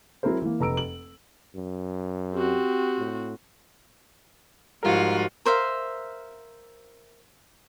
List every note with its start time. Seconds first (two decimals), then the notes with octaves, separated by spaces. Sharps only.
0.23 F#3 C4 E4 G#4 A#4 C5
0.42 E3 A#3
0.60 F1 B4 A#5 E6 D7
0.77 F#7
1.55 F#2
2.35 C4 F#4 G4
2.98 A2
4.83 G#2 F3 G3 F4 F#4 A#4
5.45 A#4 C5 E5 F5